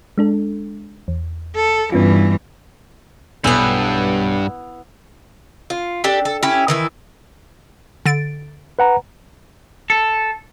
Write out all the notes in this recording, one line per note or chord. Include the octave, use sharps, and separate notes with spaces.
G#3 D4 A4
E2
A4
G2 E3 B3 C#4 F4
B1 G2 B3 E4 G#5 F7
F4
D4 G4 A4
A4
C#4 E4 G4
D#3 E3 E4
D3 A6 D7
B4 F#5 A#5
A4